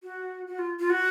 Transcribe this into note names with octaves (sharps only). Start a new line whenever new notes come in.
F#4
F#4
F4
F4
F#4